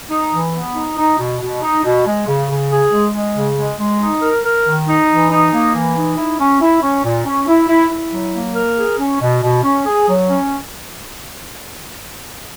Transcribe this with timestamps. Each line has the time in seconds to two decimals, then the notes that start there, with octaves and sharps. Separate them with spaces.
0.10 D#4
0.32 E3
0.53 B3
0.76 D#4
0.97 D#4
1.19 B2
1.40 B2
1.62 D#4
1.84 B2
2.06 G#3
2.27 C#3
2.49 C#3
2.71 G#4
2.92 G#3
3.14 G#3
3.36 C#3
3.58 G#3
3.79 G#3
4.00 D#4
4.22 A#4
4.44 A#4
4.66 D#3
4.87 D#4
5.09 E3
5.31 D#4
5.52 A#3
5.74 E3
5.96 D#4
6.17 E4
6.39 C#4
6.61 E4
6.82 C#4
7.04 A#2
7.26 C#4
7.47 E4
7.69 E4
7.91 E4
8.12 F#3
8.34 A#3
8.56 A#4
8.77 G#4
8.99 C#4
9.21 B2
9.42 B2
9.63 C#4
9.86 G#4
10.07 F#3
10.29 C#4